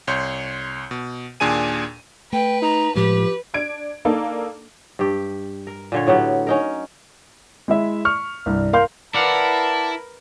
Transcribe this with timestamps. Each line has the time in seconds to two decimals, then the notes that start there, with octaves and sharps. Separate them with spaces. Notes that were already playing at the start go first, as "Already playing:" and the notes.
0.07 C2 C#5 C6 G6
0.91 B2
1.40 D#2 A#2 D4 G#4 G#5 D#7
2.33 A3 B4 G5
2.62 D#4 A#5
2.95 A2 F3 G#3 G4 B4
3.54 D4 G#6 D7
4.05 A#3 D4 D#4 A4
4.99 G2 G4
5.67 A#4
5.92 A#2 D3 C#5
6.07 A2 F#3 B3 G4
6.47 C#4 D#4 A#4
7.68 G#3 E4 E5
8.05 C#6 F6
8.46 C2 G2
8.73 A#4 F5 C6 G6
9.14 E4 A#4 B4 D5 F5 F#5 A5